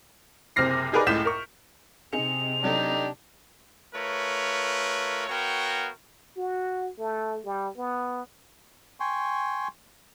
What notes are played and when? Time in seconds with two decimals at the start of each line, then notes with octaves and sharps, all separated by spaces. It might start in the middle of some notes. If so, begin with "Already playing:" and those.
0.56 F#1 C3 C4 F6 A#6 C7
0.92 D#4 G4 G#4 A#4 B4 D5
1.07 F#1 C#2 A2 G6 B6 E7
1.25 A#4 C#6
2.13 C3 C4 D#4 G#4 C#7 F7
2.64 F#3 D4 D#4 G4 A4
3.94 A3 F4 A#4 B4 C#5
5.28 B3 F#4 A#4 C#5 F5 G5
6.38 F#4
6.99 A3
7.45 G3
7.77 B3
9.00 G5 G#5 C6 C#6